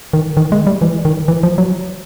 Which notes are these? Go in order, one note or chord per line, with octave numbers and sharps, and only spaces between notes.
D#3
D#3
G#3
G3
E3
D#3
E3
F3
F#3